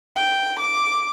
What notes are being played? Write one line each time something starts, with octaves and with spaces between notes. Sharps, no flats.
G5
D6